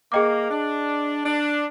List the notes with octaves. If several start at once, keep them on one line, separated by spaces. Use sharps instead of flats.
A#3 G#4 D#5 G5 D6
D4
D4